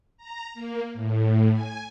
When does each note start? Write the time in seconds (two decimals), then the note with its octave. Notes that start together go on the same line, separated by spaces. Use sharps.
0.17 A#5
0.54 A#3
0.93 A2
1.52 G#5